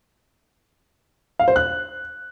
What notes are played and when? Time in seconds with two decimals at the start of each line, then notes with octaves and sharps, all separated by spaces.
1.39 F5
1.48 C5
1.56 F#6